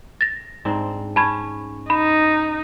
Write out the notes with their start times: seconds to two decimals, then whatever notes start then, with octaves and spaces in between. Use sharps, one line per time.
0.21 A6 A#6
0.65 G#2 C4 D4
1.16 C#4 A5 B5 G#6
1.90 D#4 B5